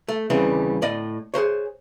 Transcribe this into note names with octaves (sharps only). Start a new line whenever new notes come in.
A3
D#2 C#3 E3 G3 C4
A2 D5 D#5
G#4 A#4 C5 C#5